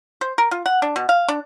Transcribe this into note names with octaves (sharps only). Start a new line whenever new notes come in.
C5
A#4
F4
F#5
D4
B2
F5
D4